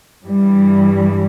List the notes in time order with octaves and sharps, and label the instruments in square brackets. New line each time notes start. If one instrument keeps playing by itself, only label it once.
[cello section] G2 E3 G3